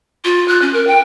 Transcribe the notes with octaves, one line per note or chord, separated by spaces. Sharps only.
F4
F#6
C#4
A#4
G5